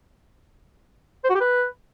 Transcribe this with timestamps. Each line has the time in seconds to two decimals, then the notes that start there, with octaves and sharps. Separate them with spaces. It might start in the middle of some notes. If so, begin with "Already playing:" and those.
1.24 C5
1.30 F#4
1.35 G4
1.41 B4